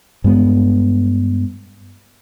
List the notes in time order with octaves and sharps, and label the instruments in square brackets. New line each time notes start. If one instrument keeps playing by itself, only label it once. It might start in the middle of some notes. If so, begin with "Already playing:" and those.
[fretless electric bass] G2 G#3 B3